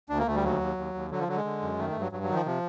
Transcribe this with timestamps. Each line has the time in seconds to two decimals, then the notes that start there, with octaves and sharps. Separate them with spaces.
0.10 D2 D4
0.18 A#3
0.27 D2 A3
0.35 G3
0.44 D#2 F#3
0.60 D#2
0.77 D#2
0.94 D#2
1.11 D3 F#3
1.20 F3
1.28 D3 F#3
1.36 G#3
1.45 D3
1.62 F#2
1.79 D#3 A3
1.90 G2 A3
2.01 F#3
2.12 G2 F#3
2.23 F#3
2.29 D#3
2.35 F3
2.46 C3 F3